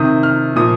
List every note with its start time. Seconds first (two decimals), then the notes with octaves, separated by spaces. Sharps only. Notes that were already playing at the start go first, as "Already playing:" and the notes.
Already playing: C3 D#3 D#6
0.23 F6
0.56 A#2 F3 D#6